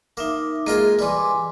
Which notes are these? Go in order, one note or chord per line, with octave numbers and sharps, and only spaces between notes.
A#3 D#4 E5 D6
G#3 A#3 F4 G#4 A#4
E3 G3 G#5 C6 D6